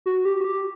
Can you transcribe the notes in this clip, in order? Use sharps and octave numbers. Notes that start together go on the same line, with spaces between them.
F#4
G4
F#4
G4